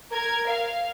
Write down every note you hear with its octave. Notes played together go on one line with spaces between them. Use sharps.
A#4 G#6
F5